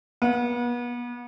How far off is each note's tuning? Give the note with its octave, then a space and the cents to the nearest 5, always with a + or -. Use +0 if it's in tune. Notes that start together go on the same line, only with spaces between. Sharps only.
B3 -35